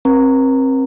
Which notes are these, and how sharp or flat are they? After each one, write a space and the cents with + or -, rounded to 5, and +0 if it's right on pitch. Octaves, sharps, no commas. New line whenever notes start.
C4 +25 A#4 +40 A#5 -15